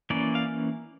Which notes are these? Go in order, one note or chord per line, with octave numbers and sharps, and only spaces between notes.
E3 A#3 C#4 D5
F5